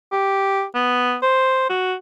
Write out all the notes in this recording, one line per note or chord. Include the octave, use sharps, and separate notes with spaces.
G4
B3
C5
F#4